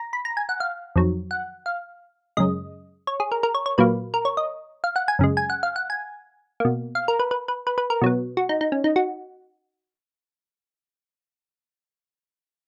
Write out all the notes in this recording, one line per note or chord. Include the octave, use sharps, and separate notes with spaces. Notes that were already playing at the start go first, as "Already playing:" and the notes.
Already playing: A#5
B5
A#5
G#5
F#5
F5
F2 D#3 F#3
F#5
F5
F#2 C#3 G#3 D#5
C#5
G#4
A#4
A#4
C#5
C#5
A#2 F#3 A#3 B4
A#4
C#5
D#5
F5
F#5
G#5
F#2 C#3 G#3
G#5
F#5
F5
F#5
G#5
B2 A#3
F5
A#4
B4
B4
B4
B4
B4
A#4
B2 F#3 B3
F#4
D#4
D#4
C#4
D#4
F#4